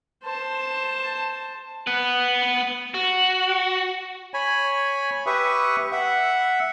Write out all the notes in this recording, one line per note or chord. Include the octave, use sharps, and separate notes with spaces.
C5 A5
B3 B4
F#4
C#5 G#5 B5
G4 B4 E5 C#6 D#6
E5 F#5